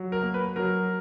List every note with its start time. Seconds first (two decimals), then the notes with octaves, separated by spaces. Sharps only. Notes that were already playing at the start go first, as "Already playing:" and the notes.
Already playing: F#3
0.12 A#4
0.23 A#3
0.34 B4
0.56 F#3 A#4